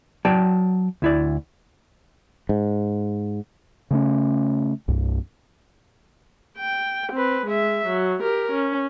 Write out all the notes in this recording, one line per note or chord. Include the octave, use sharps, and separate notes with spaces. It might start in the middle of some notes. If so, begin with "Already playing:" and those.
F#3 D5 G5 A5
D2 E4 D5
G#2
C#3 A3 C#4
C2 G2
G5
C4 B4
G#3 E5
F#3
G4 A#4
C#4